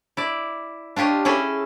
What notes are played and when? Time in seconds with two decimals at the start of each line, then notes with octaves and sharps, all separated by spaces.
0.17 E4 D5
0.96 D4 F4 G4 C#5 D#5
1.25 C#4 E4 G#4 A4